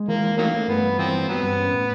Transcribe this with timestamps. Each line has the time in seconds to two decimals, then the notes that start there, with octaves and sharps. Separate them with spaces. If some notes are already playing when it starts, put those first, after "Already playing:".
Already playing: G#3
0.08 E3 A#3
0.24 E3
0.38 D#3 F#3 A3 A#3
0.54 A3
0.68 G2 B3
0.83 G2
0.98 E3 F3 C4
1.13 G2
1.28 G2 F#3 B3
1.43 G2
1.58 C#4
1.74 A2